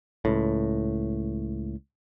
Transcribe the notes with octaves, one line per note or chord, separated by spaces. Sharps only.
C#2 A2